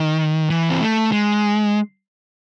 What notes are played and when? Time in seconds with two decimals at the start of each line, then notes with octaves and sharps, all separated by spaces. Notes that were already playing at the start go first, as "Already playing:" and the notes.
Already playing: D#3
0.50 E3
0.70 C4
0.81 A3
1.12 G#3